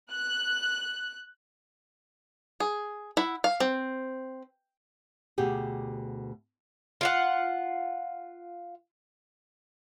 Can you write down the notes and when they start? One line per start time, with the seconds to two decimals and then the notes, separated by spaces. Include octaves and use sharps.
0.12 F#6
2.60 G#4
3.17 E4 F#5
3.44 F5
3.60 C4
5.38 D2 B2 G4 G#4
7.01 F4 F5 F#5